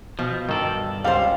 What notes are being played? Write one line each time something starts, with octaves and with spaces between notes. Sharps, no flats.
B2 F3
G2 D#3 A4 D5
C#2 G3 C5 F5